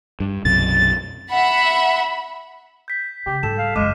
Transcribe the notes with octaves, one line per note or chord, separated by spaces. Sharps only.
G2
B1 F#2 C3 A6
E5 F#5 B5
G6 B6
C#3 G4
G#2 G3 A4 E7
F5
F#1 F#3 G#3 D6 F6 D#7